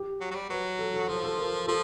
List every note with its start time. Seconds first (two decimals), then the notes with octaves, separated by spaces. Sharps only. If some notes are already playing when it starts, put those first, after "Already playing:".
Already playing: G4
0.21 F#3
0.31 F#3
0.35 G3
0.50 F#3 B4
0.79 A4
0.94 A4
1.08 F3 A4
1.24 A4
1.38 A#4
1.67 F3 A4